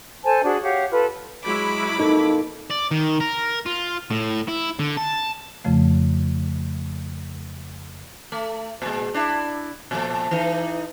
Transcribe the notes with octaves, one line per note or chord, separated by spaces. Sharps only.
A4 C5 G#5 A5
D4 F#4 G#4 D5
G4 C#5 F5 F#5
F4 A4 B4
F#3 G#3 E4 B5 D6
F2 A#3 D#4 A4
D5
D#3
A#4
F4
A2
E4
D3
A5
F2 C#3 F3 A3
A3
A#2 G#3
D4 E4
A#2 F3 A3
E3 D#4